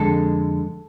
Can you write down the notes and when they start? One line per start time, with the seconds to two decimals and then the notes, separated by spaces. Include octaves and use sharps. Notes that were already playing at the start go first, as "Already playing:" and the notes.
Already playing: F2 D3 G#3 A4